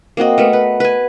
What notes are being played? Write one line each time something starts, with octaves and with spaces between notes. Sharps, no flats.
A#3 C4 F#4 D#5
A3 B3 A#4
B4
B4 G#5